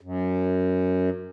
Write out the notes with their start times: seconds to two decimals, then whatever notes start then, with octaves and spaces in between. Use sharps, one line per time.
0.01 F#2